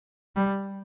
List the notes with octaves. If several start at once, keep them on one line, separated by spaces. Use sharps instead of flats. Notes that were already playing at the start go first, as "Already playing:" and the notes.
G3